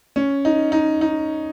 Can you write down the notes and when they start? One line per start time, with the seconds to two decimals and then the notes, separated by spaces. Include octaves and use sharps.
0.16 C#4
0.45 D#4
0.72 D#4
1.01 D#4